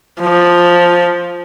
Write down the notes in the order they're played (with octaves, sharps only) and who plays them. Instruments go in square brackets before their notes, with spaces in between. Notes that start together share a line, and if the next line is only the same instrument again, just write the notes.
[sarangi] F3